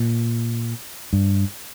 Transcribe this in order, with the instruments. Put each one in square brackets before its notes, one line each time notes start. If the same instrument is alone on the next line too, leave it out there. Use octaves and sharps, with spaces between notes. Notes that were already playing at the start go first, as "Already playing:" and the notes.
Already playing: [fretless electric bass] A#2
G2